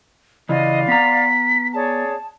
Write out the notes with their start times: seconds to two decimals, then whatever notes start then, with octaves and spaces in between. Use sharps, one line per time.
0.49 C#3 E3 D5 D#5 F5 C6
0.88 B3 A#5 B6
1.73 G#4 C#5 D5 A5